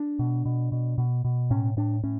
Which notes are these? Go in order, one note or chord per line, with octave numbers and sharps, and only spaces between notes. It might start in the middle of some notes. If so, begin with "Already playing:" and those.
Already playing: D4
B2
B2
B2
B2
B2
A2 C#4
A2 D4
A2 C#4